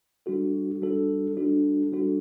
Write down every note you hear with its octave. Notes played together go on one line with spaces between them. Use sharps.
G3 D4 F#4 A4
G3 D4 F#4 A4
G3 D4 F#4 A4
G3 D4 F#4 A4